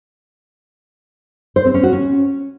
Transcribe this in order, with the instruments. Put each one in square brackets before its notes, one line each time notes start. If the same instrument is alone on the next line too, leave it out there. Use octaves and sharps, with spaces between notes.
[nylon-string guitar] C5
C4
C#4
F#4
C#4